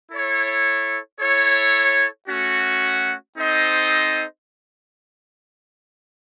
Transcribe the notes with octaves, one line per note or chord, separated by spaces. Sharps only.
E4 A4 C#5
E4 A4 C#5
A3 C#4 F#4
C4 D#4 A4 C5 D#5